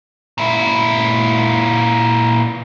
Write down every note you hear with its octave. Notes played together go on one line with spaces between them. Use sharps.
A#2 E4